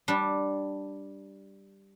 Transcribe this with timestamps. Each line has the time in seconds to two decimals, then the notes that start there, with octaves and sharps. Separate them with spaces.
0.08 G3 D4